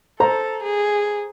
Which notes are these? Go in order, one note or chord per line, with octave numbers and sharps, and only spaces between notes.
A4 C5 A#5
G#4